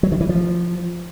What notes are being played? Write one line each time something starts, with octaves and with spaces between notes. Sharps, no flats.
F#3
D#3
E3
F3